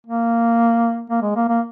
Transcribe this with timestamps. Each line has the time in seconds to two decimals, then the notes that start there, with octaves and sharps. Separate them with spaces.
0.07 A#3
1.10 A#3
1.22 G#3
1.36 A#3
1.48 A#3